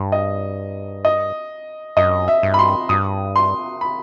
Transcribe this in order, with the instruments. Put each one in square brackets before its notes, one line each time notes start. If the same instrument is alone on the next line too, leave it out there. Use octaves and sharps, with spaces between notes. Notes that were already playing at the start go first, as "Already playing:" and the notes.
Already playing: [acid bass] G2
[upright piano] D#5
D#5
[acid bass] F#2 [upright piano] D#5
[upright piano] E5
[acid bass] G2
[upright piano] B5
C6
[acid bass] G2 [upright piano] D#6
[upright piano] C6
B5